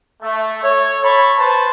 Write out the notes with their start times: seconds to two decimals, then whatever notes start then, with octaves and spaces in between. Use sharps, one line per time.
0.22 A3
0.62 A4 C#5
1.03 A5 B5 C#6
1.38 B4 C5 A5